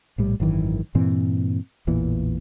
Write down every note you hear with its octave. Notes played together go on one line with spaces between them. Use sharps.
A#1 A2 G3
G#1 F#2 D#3 E3
G2 A#2 E3 C4
A1 E2 A#2 E3